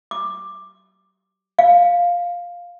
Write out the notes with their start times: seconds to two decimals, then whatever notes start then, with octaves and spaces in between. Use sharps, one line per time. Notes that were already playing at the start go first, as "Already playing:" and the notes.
0.11 D6
1.59 F5